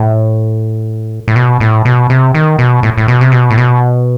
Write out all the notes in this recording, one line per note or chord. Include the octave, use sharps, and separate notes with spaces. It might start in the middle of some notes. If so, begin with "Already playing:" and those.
Already playing: A2
A2
B2
A2
B2
C3
D#3
B2
A2
A2
B2
C3
B2
A2
B2